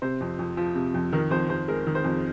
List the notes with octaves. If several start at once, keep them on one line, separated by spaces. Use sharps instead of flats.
C3 C5
F2
F2
F3
C3
F2
D#3 A#4
F2 C5
F2 C5
G#3 A#4
D#3
C5
F2